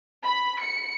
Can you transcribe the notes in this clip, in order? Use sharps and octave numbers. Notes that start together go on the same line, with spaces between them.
B5
C#7